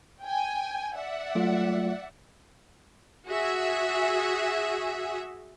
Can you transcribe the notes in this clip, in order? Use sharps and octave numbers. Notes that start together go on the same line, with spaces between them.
G5 G#5
D5 E5 F#5
F#3 A3 F4
F#4 G#4 E5